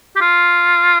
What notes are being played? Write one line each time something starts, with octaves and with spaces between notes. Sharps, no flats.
G4
F4